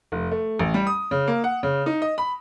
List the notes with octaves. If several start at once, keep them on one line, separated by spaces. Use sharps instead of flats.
F1
A3
A1
G3
D#6
C#3
A#3
F#5
C#3
D#4
D#5
B5